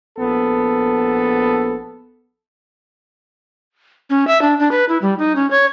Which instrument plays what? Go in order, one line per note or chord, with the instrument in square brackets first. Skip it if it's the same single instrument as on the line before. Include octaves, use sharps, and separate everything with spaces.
[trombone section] A#1 B3 A4
[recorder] C#4
E5
D4
D4
B4
E4
G3
D#4
C#4
C#5